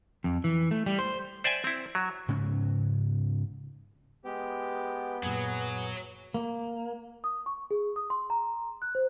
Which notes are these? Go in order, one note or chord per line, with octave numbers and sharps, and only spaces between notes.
F2
E3
A3
G3
C5
C5 D5 E5 G5 G#5
C4 E4
F#3
G#2 C#3 C#4
G#3 B3 G4
F#2 A#2 F#3 G#4
A#3
D#6
C#6
G#4
D#6
C6
A#5
F#6
C5